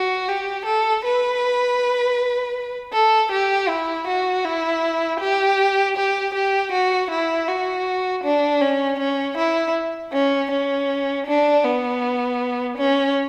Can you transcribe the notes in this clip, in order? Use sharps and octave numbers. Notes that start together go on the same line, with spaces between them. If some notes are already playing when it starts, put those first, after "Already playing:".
Already playing: F#4
G4
A4
B4
A4
G4
E4
F#4
E4
G4
G4
G4
F#4
E4
F#4
D4
C#4
C#4
E4
C#4
C#4
D4
B3
C#4